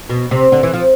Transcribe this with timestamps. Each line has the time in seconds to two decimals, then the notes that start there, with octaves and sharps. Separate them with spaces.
0.10 B2
0.31 C3
0.52 D3
0.63 E3
0.73 F3